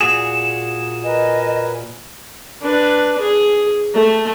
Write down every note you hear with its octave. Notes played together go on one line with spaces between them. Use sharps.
A#2 F#4 G#4 E7
A#4 B4 D#5 G#5
D4 B4
G#4
A3